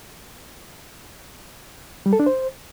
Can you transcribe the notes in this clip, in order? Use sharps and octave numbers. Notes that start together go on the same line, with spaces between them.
G3
A4
D4
C5